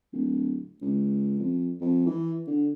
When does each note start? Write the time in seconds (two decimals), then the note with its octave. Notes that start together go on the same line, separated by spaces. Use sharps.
0.13 D1
0.82 C#2
1.39 F2
1.81 F2
2.07 E3
2.47 D3